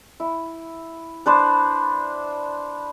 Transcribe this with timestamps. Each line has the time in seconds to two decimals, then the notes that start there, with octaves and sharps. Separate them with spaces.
0.20 E4
1.26 D4 B4 C5